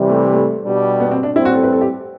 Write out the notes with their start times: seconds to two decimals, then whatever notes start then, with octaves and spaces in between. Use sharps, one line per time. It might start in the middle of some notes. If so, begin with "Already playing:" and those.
Already playing: C3 E3 G3
0.09 A3
0.33 A3
0.64 B2 G3 D4 G4
1.00 B3
1.11 C4
1.23 D4
1.36 A2 G3 C4 E4
1.45 F#4
1.54 A4
1.63 B4
1.72 A4
1.81 G4